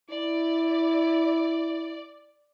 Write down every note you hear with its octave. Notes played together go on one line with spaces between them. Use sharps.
E4 D5